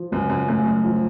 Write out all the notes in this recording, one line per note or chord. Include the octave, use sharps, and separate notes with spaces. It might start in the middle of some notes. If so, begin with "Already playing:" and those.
Already playing: F3
C#2 F#2
F#2
F#2 A3
F#2
F3